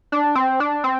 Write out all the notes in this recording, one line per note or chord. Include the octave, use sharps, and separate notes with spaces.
D4
C4
D4
C4